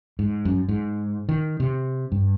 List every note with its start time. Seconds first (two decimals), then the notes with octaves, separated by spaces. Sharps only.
0.19 G#2
0.45 F#2
0.69 G#2
1.29 D#3
1.60 C3
2.12 G2